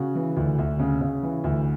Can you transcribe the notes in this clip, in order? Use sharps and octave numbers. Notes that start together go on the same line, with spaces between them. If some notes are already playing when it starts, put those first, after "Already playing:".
Already playing: C#3 F#4
E3
D2
D2
C#3
C#3
E3
D2